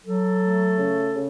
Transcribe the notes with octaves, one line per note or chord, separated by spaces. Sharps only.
F#3 A4
A3
C#3
C#3